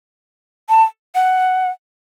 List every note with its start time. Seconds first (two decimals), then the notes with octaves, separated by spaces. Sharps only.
0.69 A5
1.15 F#5